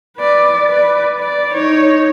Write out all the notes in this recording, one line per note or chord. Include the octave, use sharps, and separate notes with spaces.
B4 D5
B4 D5
D5
D#4 C#5